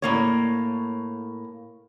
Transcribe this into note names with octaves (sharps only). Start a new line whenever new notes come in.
A2 A#3 C#5